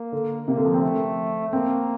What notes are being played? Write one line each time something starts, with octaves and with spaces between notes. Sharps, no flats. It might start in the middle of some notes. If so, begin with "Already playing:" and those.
Already playing: A#3
D3
C3 A#3
D3
F3
C4
A3
A#3 C4